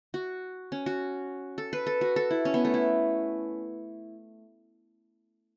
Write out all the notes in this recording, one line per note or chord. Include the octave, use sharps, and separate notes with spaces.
F#4
C#4
F#4
A4
B4
A4
F#4
A4
E4
C#4
B3
A3
E4